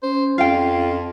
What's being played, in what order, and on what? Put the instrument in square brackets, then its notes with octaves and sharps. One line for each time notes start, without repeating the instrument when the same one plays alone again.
[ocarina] C#4 [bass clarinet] C5
[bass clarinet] F2 [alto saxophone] F4 [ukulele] F5 G5